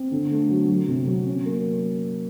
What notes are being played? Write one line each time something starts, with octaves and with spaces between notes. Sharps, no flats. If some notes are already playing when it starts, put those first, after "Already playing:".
Already playing: C4
D3
A3
F#3
F#3
C3
F#3
C#4
A#3